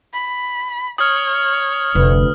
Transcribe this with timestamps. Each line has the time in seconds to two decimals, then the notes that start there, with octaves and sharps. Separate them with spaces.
0.13 B5
0.98 C#5 D#6 F6
1.95 F1 D2 B4